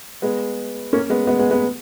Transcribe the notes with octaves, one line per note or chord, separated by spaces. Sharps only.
G#3 B3
A#3 C#4
G#3 B3
G#3 B3
G#3 B3
G#3 B3